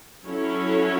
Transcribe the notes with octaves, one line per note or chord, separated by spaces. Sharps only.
F#3 C#4 E4 A4 C#5